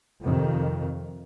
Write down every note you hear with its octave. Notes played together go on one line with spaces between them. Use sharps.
F2 C3 D#3